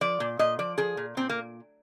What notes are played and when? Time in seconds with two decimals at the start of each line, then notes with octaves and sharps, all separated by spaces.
0.01 F3 D5
0.20 A#2
0.39 A#2 D#5
0.59 F3 D5
0.78 F3 G#4
0.97 A#2
1.17 A#2 C4
1.29 A#3